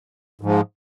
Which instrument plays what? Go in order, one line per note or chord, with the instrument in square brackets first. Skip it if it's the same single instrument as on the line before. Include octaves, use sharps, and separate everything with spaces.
[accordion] G#2 F3 G#3